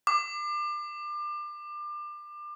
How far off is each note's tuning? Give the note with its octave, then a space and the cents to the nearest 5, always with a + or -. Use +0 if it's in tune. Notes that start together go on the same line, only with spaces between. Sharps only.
D6 +30